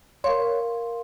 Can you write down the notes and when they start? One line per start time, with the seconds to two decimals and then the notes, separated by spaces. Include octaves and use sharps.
0.24 A#4 C#5 F5 C6